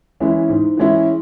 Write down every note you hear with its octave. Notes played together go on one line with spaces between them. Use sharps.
E3 G#3 C#4 E4
G#2
E3 G#3 C#4 E4